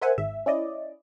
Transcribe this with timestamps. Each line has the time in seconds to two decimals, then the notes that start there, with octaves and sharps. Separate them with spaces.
0.01 A#4 C5 E5 F#5 G#5
0.17 G#1 G#2 E5
0.46 C#4 E4 D5 D#5